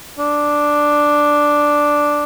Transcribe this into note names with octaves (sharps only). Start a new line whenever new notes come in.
D4